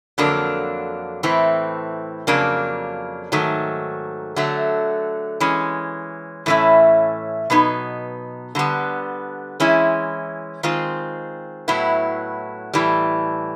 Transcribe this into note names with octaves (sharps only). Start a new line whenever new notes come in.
F2 D3 F#3 A#3 D4
A2 E3 A3 C4
F2 C#3 F#3 A#3 D4
G#2 D#3 F#3 A3
D3 F#3 A3
E3 G#3 C#4
A2 E3 A3 C#4 E4
B2 F#3 B3 D#4
D3 G3 B3
E3 G#3 C#4 E4
D#3 G#3 C4 F4
A2 F#3 B3 E4
A2 E3 G3